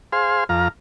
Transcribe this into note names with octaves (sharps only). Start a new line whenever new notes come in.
G#4 C5 F5 C6
F2 F5 A#5